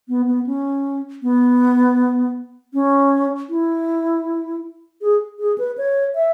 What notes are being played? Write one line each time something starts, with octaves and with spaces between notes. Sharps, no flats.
B3
B3
C#4
B3
C#4
E4
G#4
G#4
B4
C#5
E5